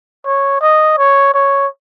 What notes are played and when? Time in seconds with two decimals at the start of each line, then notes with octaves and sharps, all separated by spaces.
0.25 C#5
0.61 D#5
0.98 C#5
1.34 C#5